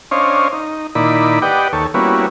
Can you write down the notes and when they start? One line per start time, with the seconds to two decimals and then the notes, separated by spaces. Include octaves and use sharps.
0.11 C#4 D4 C5 C#5 D#5 F5
0.53 D#4
0.95 A#2 D#3 D#4 E4 D5 B5
1.42 G4 B4 D5 D#5 F#5 G5
1.73 D#2 A4 C#5
1.94 G3 A#3 B3 C#4 E4 F#4